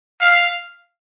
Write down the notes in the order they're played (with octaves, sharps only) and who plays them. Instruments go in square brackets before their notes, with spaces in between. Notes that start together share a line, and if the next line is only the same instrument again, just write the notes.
[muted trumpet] F5